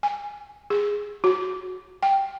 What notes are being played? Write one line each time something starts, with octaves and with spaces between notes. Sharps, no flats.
G#5
G#4
F#4
G5